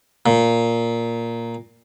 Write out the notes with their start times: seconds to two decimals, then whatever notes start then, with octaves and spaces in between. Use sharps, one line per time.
0.26 A#2